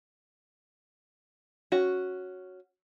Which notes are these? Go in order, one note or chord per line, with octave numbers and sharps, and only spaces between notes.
C#4 F#4